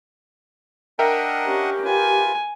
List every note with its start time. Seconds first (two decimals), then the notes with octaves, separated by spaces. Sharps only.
0.99 D4 A#4 D#5 E5 F#5 G5
1.45 C#4 G4
1.85 F4 B4 G#5